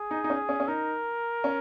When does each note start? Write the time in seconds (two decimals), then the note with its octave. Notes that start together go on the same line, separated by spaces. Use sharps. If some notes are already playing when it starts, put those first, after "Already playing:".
Already playing: G#4
0.11 D#4
0.24 D#4
0.30 C#4
0.49 C#4
0.60 C#4
0.68 D#4 A#4
1.44 C#4